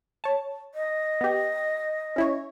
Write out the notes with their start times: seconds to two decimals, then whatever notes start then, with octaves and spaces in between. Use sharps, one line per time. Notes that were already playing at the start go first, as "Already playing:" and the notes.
0.24 C#5 A5
0.75 D#5
1.21 B3 G4
2.16 C#4 E4 C#5